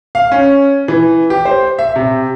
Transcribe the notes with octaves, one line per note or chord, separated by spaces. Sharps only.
F5
C#4
E3
G4
C5
E5
C3